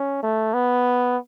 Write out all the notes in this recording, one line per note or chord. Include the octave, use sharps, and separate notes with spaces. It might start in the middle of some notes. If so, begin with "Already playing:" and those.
Already playing: C#4
A3
B3